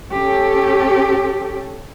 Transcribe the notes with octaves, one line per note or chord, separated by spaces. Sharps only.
C#4 G4 A4